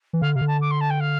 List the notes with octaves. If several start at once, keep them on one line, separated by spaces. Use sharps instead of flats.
E3
D3 F5
C3 F5
D3
A5
D6
C6
A5
G5
F5